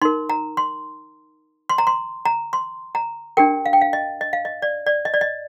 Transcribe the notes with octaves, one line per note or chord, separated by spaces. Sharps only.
D#4 A#4 C6
A#5
C6
C6
A#5
C6
A#5
C6
A#5
D4 G4 A#4 G5
F5
G5
F5
D#5
D#5
F5
D#5
D5
D5
D#5
D5
D#5